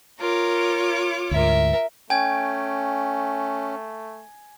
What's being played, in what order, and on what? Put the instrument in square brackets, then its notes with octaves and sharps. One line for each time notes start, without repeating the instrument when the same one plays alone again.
[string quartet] F4 C#5 D6 [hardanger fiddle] A#4
[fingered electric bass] D2 G#2 [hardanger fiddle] A#4 E5
[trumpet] A3 [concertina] C#4 [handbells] G5 [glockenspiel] G#5 G#6